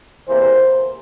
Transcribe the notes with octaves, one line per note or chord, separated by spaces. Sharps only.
E2 C3 E3 A#3 C5